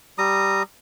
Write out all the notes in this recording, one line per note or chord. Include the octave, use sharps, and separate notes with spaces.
G3 A#5 D#6